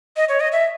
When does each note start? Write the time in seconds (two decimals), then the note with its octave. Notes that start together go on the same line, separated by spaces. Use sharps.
0.17 D#5
0.29 C#5
0.40 D#5
0.52 E5